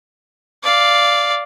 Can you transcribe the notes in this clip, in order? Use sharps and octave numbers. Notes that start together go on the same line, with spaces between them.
D5 F5